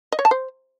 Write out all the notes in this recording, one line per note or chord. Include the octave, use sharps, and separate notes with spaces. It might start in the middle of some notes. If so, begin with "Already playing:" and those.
D#5
C#5
A5
C5